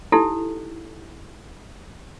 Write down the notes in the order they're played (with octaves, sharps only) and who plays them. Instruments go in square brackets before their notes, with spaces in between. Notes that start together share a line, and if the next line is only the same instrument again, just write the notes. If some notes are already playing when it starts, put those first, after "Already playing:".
[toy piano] D#4 E4 G4 A4